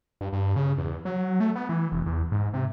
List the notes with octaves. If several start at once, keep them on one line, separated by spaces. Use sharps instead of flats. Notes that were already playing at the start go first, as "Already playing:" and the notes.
G2
G2
C#3
E2
F#3
A3
B3
E3
F1
E2
G#2
C3